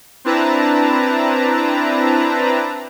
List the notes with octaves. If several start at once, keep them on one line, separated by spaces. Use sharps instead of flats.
C4 D4 E4 B4 A5 A#5